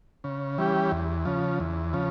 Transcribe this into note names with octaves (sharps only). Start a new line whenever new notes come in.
C#3
E3 G3 C#4 G4
E2
C#3 F3
E2
C#3 F3